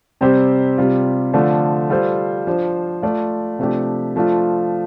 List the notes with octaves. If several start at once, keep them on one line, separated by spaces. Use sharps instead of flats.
C3 G3 C4 G4 C5
C3 G3 F4
D3 F3 A3 D4 F4
G3 F4 A4 C5
F3 D4 F4 C5
A3 F4 D5
C3 F3 A3 D4 G4
F3 A3 D4 F4